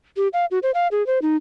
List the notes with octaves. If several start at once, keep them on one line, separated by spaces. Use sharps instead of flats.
G4
F5
F#4
C5
F5
G#4
C5
D#4